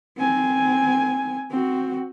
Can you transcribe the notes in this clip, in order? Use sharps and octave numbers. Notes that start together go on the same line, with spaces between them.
C4 G#5
C4 F#4